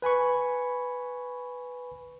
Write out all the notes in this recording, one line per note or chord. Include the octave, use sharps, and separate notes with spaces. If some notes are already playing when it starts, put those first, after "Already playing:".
B4 G#5 B5 C#6